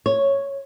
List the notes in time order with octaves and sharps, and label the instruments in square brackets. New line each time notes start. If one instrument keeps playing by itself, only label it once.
[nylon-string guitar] C#5